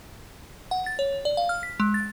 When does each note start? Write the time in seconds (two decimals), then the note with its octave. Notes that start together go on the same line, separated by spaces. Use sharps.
0.71 F#5
0.86 A6
0.99 C#5
1.25 D5
1.37 F5
1.49 F6
1.63 B6
1.80 G#3
1.94 A6